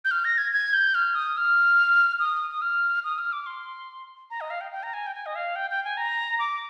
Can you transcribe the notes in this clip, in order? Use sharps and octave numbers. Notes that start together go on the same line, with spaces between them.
G6
F6
A#6
G#6
G#6
G6
F6
D#6
F6
D#6
D#6
F6
D#6
F6
D6
C6
A#5
D#5
F5
G5
G5
A#5
G#5
G5
G#5
D#5
F5
G5
G5
G#5
A#5
D6